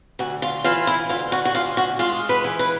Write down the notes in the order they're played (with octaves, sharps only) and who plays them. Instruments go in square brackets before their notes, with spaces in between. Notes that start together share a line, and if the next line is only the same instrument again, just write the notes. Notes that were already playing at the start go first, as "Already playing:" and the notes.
[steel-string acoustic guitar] D2 F#4
F4
E3 F4
E4
D2 F4
F#4
F#4
D2 F4
F#4
G#3 F4
B4
E3
B4